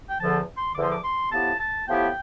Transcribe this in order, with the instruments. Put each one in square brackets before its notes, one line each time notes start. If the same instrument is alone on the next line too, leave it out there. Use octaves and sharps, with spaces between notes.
[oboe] G5
[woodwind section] E2 D3 F3 [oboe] A5
[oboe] C6
[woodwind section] E2 D3 F3 [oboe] D6
[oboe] C6
D6
C6
[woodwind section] A2 F3 B3 E4 G4 [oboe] A5
[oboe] A5
[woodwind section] A2 F3 B3 E4 G4 [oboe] G5